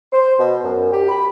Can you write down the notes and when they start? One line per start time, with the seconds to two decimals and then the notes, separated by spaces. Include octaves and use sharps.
0.12 C5
0.39 B2
0.64 F#2
0.92 G4
1.09 B5